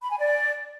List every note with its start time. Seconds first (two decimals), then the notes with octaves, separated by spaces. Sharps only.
0.02 B5
0.10 G#5
0.18 D5